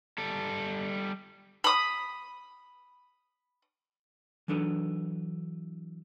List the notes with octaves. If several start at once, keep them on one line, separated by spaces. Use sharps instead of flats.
G3 A4
B5 D#6
E3 F#3 D4 A4 B4